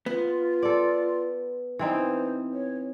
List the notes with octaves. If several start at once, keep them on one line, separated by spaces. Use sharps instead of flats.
B3 F4
A4 D5
E3 C4 D#4 C5
C#5